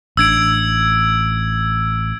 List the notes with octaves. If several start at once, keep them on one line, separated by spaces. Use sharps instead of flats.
A1 D4 E6 G#6 D7